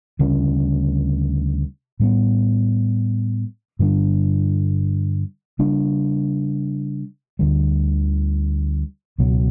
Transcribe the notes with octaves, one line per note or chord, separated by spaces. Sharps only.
D2 C#3 G3 C#4
A2 G3 B3
G2 D3 G3 D4
C#3 G3 D4
D2 D3 G3
C#2 B2 F#3